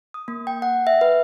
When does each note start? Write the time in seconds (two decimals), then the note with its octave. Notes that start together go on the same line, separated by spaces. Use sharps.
0.14 D#6
0.28 A#3
0.47 G5
0.62 F#5
0.87 E5
1.01 B4